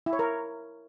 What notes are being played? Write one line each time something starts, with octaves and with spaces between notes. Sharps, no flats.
E4
C#5
A#4